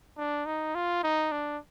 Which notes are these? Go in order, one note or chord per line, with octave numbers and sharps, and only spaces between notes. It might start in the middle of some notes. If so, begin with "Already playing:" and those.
D4
D#4
F4
D#4
D4